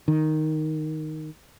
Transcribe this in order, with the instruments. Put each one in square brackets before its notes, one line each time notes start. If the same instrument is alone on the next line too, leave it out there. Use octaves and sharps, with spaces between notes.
[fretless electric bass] D#3